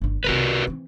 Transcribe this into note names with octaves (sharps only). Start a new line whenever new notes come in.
G1 D3
C2 C3 F#4 A#4 B4
E3 C4